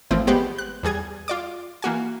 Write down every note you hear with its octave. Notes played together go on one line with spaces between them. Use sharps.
G#1 E3 F3 A3 C4
G#3 B3 G4 B4 C5
F#6
E2 G3 G#4 G#6
F4 D5 D6
E3 A#3 F#4 G#5